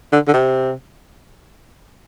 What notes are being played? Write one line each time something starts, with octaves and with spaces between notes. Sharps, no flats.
D3
D3
C3